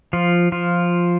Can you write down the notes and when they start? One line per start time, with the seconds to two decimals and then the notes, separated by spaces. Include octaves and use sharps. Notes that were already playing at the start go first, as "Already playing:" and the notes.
0.13 F3 F4
0.52 F3 F4